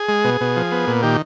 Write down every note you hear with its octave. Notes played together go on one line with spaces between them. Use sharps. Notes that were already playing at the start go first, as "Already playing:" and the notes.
Already playing: G#4
G#3
B2
B2
F3
B3
A#2
D#3 G4